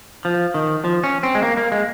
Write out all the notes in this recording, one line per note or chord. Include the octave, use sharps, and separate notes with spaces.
F3
D#3
F3
C#4
C4
G#3
A#3
A#3
G#3